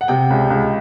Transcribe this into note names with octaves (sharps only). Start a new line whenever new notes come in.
F#5
C3 G5
C#2
C#2